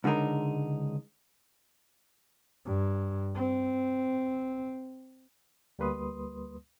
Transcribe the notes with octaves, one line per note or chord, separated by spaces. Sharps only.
C#2 D3 G#3 D#4 A#4
G2
C4
D2 G3 A#3 B4 C6 D#6